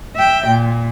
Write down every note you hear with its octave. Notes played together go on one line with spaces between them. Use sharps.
E5 G5
A#2